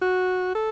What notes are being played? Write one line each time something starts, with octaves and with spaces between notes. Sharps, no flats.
F#4
A4